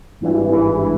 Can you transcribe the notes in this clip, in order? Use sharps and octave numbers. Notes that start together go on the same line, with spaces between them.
G#1 G2 E3
G#1 G2 E3
E3